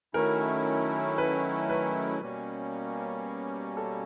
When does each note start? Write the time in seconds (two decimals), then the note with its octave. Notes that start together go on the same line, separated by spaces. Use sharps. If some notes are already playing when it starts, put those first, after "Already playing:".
0.14 D#3 F#3 A3 C#4 E4 A#4
1.18 B4
1.69 B4
2.21 B2 G3 A#3 C#4
3.77 A4